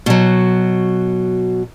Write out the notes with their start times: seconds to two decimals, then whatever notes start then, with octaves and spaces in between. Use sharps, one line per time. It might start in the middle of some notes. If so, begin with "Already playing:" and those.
0.06 B2 F#3